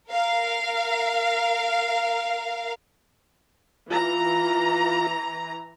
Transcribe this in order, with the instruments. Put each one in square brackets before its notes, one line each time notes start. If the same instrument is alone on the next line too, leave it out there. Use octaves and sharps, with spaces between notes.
[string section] A#4 F5
[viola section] E3 A#5 [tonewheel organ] F4